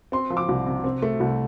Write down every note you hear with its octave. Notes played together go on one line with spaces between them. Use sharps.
C4 C6
F3
D6
C2
C3
C4
A3
C2